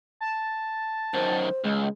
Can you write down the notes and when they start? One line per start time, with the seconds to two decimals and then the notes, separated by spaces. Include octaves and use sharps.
0.21 A5
1.14 F#2 D#3 C5
1.64 C#2 G#3